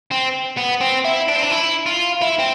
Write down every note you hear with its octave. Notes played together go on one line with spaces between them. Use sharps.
C4
B3
C4
E4
D4
C4
D4
E4
F4
E4
C4